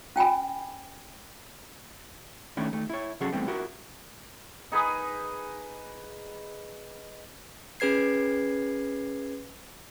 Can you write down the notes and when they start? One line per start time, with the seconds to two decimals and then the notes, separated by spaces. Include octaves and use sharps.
0.16 C#4 G5 G#5 B5
2.57 D#3 A3 C#4 D4 E4
2.73 D#2 A3
2.90 E4 C#5
3.20 C3 F#3 C#4 F#4 G#4 A4
3.32 C2 B2 E3 G3 A3 C4
3.48 E4 F#4 G4 A#4
4.72 D#4 G#4 B4
7.80 C#4 G#4 B4 G#6 C7